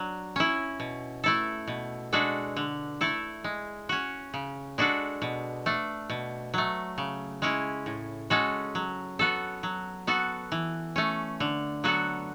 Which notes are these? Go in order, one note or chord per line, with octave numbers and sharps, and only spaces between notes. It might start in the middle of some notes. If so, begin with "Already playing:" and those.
Already playing: F#3 D4
C#4 E4
B2
A3 E4 A4
B2
G#3 D4 F#4 A4
D3
A3 E4 A4
G#3
C#4 F#4
C#3
G#3 D4 F#4 A4
B2
A3 D4
B2
F#3 A3
C#3
G#3 C#4 E4
A2
G#3 C#4 F#4 A4
F#3
B3 F#4 A4
F#3
B3 F#4 A4
E3
A3 C#4
D3
F#3 B3 F#4 A4